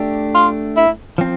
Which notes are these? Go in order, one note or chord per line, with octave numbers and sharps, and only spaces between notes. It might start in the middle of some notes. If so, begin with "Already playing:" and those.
Already playing: A3 D4 G4
F4
E4
F3 C4